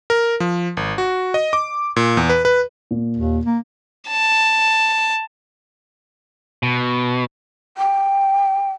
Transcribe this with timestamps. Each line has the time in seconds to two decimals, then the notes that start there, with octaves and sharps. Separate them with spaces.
0.10 A#4
0.40 F3
0.77 G#1
0.98 F#4
1.34 D#5
1.53 D6
1.96 A#2
2.17 E2
2.30 B4
2.45 B4
2.91 A#2
3.17 D#2
3.46 A#3
4.09 A5
6.63 B2
7.77 G5